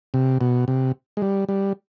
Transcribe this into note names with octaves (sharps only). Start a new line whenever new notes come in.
C3
B2
C3
G#3
G3
G3